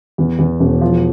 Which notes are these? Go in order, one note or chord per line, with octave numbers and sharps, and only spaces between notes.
E2
E2
E1
F3